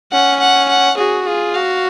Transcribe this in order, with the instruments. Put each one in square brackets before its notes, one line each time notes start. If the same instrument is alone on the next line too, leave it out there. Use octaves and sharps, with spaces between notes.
[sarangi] C#4 [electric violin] F#5
[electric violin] F#5
F#5
[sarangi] F#4 [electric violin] G#4
[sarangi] F4 [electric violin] G#4
[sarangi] F#4 [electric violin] F5